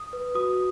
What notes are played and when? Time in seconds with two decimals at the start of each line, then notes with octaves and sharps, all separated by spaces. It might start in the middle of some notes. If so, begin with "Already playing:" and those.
Already playing: D#6
0.13 B4
0.35 F#4 D#6